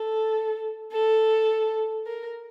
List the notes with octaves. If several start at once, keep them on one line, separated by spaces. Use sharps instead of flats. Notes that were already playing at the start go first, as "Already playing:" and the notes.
Already playing: A4
A4
A#4